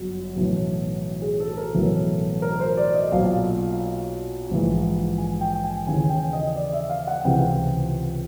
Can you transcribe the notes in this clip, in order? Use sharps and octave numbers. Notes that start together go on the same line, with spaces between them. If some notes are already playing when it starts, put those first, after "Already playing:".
Already playing: G1 F#2 F#4
B1 A2 E3
G#4
A4
A#4
B1 A2 E3 A4
A#4
C5
D5
D#5
B1 A#2 F5
A#1 G#2 E3
G#5
G5
G#5
D#2 C#3 E3 G#5
G5
D#5
D5
E5
F5
F#5
C#2 C3 E3 G5